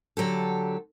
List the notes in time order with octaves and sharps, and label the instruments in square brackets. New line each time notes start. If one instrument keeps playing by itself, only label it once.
[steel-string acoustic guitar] D3 F#3 G4 A4